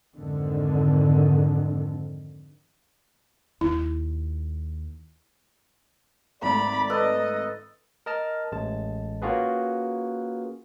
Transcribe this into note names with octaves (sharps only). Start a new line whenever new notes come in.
F2 G#2 D3 D#3
D#2 E4
G#1 A3 D5 A#5 B5
A4 B4 D#5
A#4 D#5 A5 F6
A1 G#3 A5
A#3 C#4 F4 F#4 G#4 B4